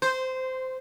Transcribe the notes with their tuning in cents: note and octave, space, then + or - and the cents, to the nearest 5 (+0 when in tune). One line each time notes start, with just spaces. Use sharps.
C5 -15